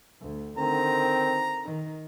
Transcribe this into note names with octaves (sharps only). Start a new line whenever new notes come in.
D2
D3 D#3 C4 A#5
D#3